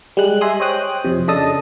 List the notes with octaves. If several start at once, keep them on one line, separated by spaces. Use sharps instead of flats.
G3 G#3 F#6
D#5 E5 G#5 C6 D#6
C5 C#5 D#5 G5 D#6 F#6
F2 C3
C#3 D4 A4 D#5 A5 D#6